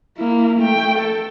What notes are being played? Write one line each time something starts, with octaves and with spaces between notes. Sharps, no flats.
A#3 E4
A3 G5
A4